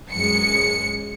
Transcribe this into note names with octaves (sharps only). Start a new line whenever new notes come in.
F#2 G#3 C#7